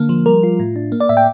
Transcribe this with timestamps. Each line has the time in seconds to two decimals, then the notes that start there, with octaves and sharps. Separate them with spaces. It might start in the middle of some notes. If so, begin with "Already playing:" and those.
Already playing: D3 A#3
0.09 F3
0.26 G3 A#4
0.43 F4
0.59 A2
0.76 D4
0.92 A#3
1.00 D5
1.09 A2 E5
1.17 G5